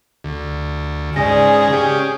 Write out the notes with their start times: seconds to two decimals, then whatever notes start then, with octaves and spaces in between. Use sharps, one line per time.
0.24 D2
1.16 G#2 C#3 G#4 D5 G#5 A#6
1.73 C#4 G4